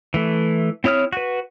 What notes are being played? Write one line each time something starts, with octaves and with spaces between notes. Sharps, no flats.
E3 A3
C4 E4 C#5 D#6 F6
F#4 B4